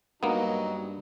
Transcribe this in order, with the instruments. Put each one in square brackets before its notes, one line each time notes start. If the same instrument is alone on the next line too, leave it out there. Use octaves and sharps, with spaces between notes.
[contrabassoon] G2 [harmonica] F#3 D#4 [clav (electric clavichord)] A#3 B3